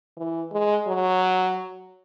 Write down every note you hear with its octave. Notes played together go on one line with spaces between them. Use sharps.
E3
G#3
F#3